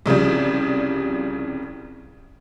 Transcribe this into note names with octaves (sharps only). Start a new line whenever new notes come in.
C2 C#3 F3 G3